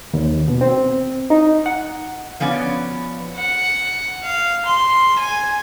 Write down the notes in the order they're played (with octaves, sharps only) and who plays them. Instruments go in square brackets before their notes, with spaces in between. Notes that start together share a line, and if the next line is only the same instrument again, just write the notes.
[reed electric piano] D#2
B2
C4
D#4
F#5
[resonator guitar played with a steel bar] F3 B3 C#4 D5
[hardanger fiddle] F#5
F5
C6
G#5